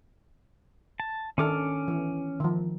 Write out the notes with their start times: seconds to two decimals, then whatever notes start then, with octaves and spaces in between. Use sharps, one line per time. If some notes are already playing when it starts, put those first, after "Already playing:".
1.00 A5
1.38 D#3 C#4 D4 A4 D6 F6
1.88 E3
2.40 D#3 F3